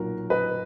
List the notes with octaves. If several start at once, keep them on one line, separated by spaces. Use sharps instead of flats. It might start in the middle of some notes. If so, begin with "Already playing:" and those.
Already playing: B1 A#2 F#3 F#4 A#4
B4 D#5